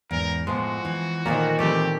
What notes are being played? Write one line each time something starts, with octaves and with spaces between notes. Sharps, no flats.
E2 G#2 A#4
A2 F3 G#3 B3 F#4
E3
A#2 D#3 A3 A#3 A#4 C5
E3 G3 A3 C4 G4 D5